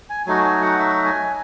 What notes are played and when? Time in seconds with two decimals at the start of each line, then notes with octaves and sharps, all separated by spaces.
0.10 G#5
0.26 F#3 A3 D#4 F#4 G#5
0.44 G#5
0.62 F#5
0.79 E5
1.05 G#5